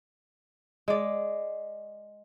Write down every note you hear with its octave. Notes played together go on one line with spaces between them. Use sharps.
G#3 D5